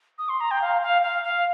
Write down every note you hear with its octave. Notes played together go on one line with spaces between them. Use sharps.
D#6
C6
A#5
G5
F5
F5
F5
F5